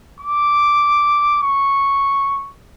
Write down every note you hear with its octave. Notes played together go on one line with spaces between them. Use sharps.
D6
C#6